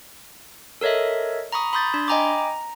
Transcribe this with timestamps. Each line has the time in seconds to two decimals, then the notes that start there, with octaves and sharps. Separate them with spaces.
0.81 A4 A#4 C#5 D#5 E5
1.52 A#5 B5 C#6 D#6
1.73 B5 C6 D#6 G6 A6
1.94 D4 C6
2.08 D#5 G5 G#5 A#5 B5 D6
2.38 A#5